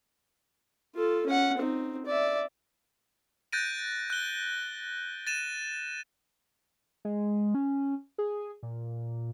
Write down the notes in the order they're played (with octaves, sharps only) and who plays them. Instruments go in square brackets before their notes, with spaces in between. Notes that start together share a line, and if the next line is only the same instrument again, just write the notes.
[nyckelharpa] F4 A4
C#4 F#5
C4 D#4
D5 E5
[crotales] F#6 G6 A6 A#6 D7 D#7
F#6 G7
A6 D#7 E7
[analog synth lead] G#3
C#4
G#4
A#2